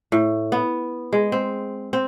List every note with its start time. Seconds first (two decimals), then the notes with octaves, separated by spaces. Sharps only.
0.12 A2
0.52 B3
1.13 G#3
1.32 C4
1.93 C4